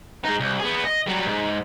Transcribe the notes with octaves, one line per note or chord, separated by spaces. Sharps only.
G#3 D#4
C2
B3 G#4
D#5
F#3 G3
G#2